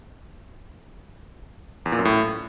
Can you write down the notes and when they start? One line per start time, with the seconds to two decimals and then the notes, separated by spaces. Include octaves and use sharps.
1.86 E2
1.92 A#2
1.99 F#2
2.05 A2